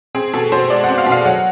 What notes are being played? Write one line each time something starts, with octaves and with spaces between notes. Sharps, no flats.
C4 G#4
B2 A4
B2 C5
G#3 D5
C4 F#5
F5
B2
F5
F#3 F#5